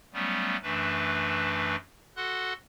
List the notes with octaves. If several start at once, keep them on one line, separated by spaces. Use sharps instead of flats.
F#3 G3 A3 B3 C#4
F#2 E3 A3 D4 B4
F#4 A4 F#5 C6 F#6